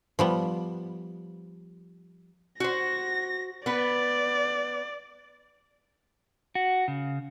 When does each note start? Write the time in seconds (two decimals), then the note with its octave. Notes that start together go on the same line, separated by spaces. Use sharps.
0.19 F3 G3 B3
2.60 F#4 C5 A#6
3.66 B3 B4 D5
6.55 F#4
6.88 C#3